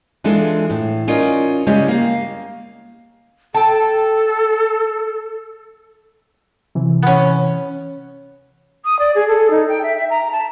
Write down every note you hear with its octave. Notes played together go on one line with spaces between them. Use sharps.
E3 G#3 D4 F4 A4
A2
C#4 D#4 F4 A#4 D5
C#3 G3 G#3 C#4 E4 G4
A#3 F5
A4 G5 A5
C3 E3
B3 C#4
D#6
D5
G#4
A4
D#4
G5
E5
E5
A#5
A5